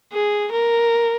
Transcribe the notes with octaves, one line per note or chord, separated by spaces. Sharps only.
G#4
A#4